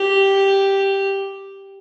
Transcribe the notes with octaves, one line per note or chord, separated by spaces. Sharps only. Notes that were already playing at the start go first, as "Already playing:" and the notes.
Already playing: G4